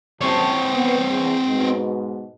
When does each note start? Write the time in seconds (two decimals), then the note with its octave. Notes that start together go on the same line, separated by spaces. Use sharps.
0.21 F#1 C3 C4 C#5 A5
0.74 B3
1.10 E2
1.47 G#2 B2